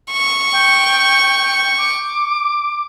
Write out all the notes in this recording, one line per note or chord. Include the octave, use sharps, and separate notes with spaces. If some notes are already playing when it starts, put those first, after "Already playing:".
C#6
G5
D6